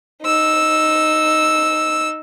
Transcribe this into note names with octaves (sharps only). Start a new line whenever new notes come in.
D#4 E6